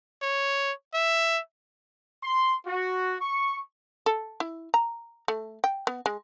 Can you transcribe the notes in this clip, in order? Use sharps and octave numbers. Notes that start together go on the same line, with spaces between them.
C#5
E5
C6
F#4
C#6
A4
E4
A#5
A3
G5
B3
G#3